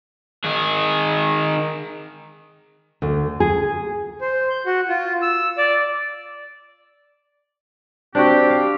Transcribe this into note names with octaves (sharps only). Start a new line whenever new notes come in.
D#3 G#4
D2
G#4
C5
G6
F#4
F4
E6
D5
C4 D4 F#4 G4
F5